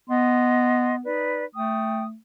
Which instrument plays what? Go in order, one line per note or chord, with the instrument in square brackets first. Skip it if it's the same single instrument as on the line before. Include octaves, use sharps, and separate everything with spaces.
[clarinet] B3 [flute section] D#5 C6
[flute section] D#4 B4 D5
[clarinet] A3 [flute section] G5 D#6